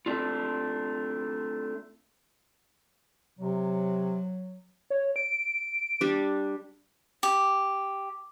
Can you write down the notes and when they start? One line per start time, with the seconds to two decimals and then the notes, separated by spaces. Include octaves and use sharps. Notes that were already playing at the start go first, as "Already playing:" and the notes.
0.06 A3 C4 D4 F4
3.39 C3 F#3
4.90 C#5
5.16 D7
6.01 G3 D4
7.23 G4